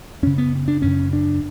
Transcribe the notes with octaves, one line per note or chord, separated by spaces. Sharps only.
F#2 C#3 C#4
B3
D4
F#2 C#3 C#4
D4